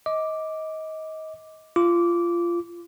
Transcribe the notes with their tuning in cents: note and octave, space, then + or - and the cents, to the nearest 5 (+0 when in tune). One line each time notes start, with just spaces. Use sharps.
D#5 +25 D6 +0
F4 -20 D6 -15